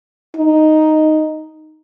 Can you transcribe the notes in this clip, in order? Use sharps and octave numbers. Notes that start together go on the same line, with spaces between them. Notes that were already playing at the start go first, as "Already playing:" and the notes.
D#4